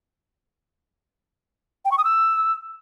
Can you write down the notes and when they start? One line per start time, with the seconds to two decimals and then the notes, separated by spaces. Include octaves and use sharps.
1.85 G5
1.91 C#6
1.98 D#6
2.04 E6